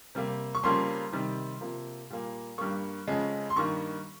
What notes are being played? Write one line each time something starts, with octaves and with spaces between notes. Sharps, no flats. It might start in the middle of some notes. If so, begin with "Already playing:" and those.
C3 G3 A#3
C#6
F2 C#3 G3 A#3 C6
C3 D#3 G3
C3 F3 A#3
A#2 G3 A#3
G2 G3 A#3 C#6
F2 C#3 G#3
C6
G2 D#3 G3 A#3 C#6